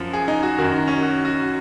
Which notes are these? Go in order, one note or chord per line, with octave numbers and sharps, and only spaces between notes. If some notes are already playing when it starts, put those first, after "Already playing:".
Already playing: F#2 F3
G#4
D#4
F#4
F#2 D#3 F#4
D#4
C#4
F#4
F#4